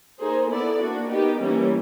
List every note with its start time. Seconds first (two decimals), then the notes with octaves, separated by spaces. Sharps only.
0.19 A#3 D#4 G#4 C5
0.50 B3 E4 A4 D5
0.80 A#3 D4 F#4
1.10 B3 D#4 G4 A#4
1.40 E3 G3 A#3 C#4